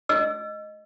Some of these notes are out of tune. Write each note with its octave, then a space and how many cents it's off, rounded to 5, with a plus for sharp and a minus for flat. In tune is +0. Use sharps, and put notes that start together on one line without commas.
D#5 +0 E6 +35